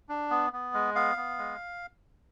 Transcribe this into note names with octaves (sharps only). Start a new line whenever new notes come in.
D4
B3
B3
G#3
B3 F5
B3
G#3